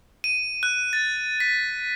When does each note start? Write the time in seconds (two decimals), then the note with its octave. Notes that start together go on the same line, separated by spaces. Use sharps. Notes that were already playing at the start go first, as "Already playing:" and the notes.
0.24 D#7
0.63 F#6
0.93 A6
1.40 B6